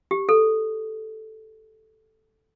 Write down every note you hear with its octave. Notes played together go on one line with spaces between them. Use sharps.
G4
A4